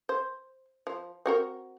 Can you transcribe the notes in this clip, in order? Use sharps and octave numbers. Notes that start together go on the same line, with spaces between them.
C5
F3
C4 F#4 A#4